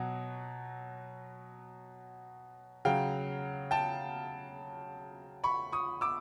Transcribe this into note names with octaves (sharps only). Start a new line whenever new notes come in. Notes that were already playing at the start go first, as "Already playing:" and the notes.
Already playing: B2 F#3
C#3 F#3 F5 G5
G5 A5
B5 C#6
C#6 D#6
D6 E6